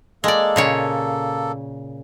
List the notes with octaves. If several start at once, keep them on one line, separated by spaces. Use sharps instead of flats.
G#3 A#3 A4 D5
A#2 C#3 C#5